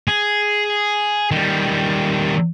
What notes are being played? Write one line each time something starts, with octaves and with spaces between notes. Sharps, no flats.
G#4
D#3 G3